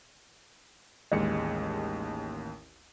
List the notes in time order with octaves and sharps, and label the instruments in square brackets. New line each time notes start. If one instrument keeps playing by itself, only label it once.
[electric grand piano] A1 D#2 C#7 [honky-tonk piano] G#3